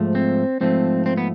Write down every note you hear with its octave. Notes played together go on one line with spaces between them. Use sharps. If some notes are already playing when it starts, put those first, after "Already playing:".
Already playing: G#2 F3 A3
C4
G#2 F3 A3 C4
C4
B3